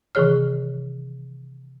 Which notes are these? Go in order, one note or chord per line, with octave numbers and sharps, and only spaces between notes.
C3 D#3 E3 G#4 C#5 F6